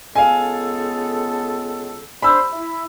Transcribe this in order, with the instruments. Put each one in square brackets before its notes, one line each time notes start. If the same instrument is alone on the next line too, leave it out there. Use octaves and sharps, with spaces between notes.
[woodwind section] C#2 B3 A4 [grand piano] F5 G#5
[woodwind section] D4 C5 [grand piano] B5 E6
[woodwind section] E4